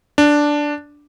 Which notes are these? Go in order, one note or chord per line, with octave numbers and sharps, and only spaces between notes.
D4